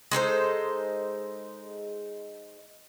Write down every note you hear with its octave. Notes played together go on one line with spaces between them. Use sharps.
G#3 D#4 A4 C5